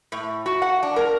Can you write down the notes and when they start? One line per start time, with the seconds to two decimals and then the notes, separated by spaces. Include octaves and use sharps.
0.12 A2
0.46 F#4
0.62 F#5
0.83 D4
0.96 A#4